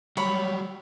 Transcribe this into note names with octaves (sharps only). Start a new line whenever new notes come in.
F#3 G3 C#5 B5